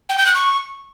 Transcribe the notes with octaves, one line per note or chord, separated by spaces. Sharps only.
G5
G6
F#6
C#6